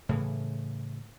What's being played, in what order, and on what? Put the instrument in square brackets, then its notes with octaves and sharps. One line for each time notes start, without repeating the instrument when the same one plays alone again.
[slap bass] A2 C#3 E3